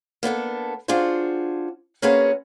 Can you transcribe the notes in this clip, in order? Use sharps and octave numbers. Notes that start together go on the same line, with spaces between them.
A#3 B3 D4 A4
D4 F4 F#4 G#4 C5
A#3 C4 C#4 F#4 G#4 B4